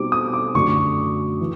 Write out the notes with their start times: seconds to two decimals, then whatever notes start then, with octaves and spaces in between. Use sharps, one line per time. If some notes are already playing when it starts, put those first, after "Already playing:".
Already playing: B2 G3 C4 D#4 G4 D6
0.12 D#6
0.33 D6
0.55 F#2 D3 F#3 A3 C#6
1.40 E3